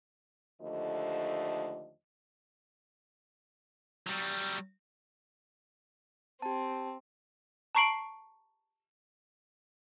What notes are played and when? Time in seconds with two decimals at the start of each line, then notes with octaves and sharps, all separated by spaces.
0.62 D#2 D3 F3 A3 D#5
4.07 F#3 G3
6.42 C4 G4 A5
7.75 A5 A#5 C#6 C7 D7 F#7